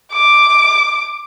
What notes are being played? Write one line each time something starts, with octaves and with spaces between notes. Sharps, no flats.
D6